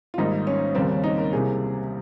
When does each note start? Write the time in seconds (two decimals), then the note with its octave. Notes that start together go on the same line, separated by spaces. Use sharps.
0.14 F4
0.18 G#1 G#2 G3 A#3 D#4
0.47 C#4
0.75 D#2 C#3 G3 A#3 C4
0.90 C#4
1.04 D#4
1.18 A#4
1.33 C2 C3 G3 A#3 G#4